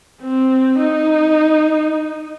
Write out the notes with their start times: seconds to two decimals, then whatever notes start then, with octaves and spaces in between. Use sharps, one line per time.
0.21 C4
0.79 D#4